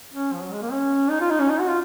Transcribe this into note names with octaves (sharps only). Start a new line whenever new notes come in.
C#4
F3
F#3
G#3
A#3
C#4
D#4
F4
D#4
C#4
D#4
F#4
F4